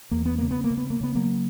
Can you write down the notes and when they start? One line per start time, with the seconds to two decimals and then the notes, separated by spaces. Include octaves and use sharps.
0.11 E2 A#3
0.25 B3
0.38 C#3 A#3
0.51 B3
0.64 A#3
0.71 C#3
0.77 B3
0.90 A#3
1.01 C#3 B3
1.15 F#3 A#3